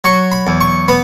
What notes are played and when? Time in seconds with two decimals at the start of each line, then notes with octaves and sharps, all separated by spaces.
0.04 F#3 C#6
0.32 B5
0.47 E2
0.61 C#6
0.88 B3 B5